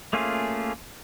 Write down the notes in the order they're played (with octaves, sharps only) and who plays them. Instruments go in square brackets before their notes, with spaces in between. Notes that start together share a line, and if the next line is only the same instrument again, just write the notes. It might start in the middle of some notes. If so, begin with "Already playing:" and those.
[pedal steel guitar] A3 A#3 C#4 F4 G#4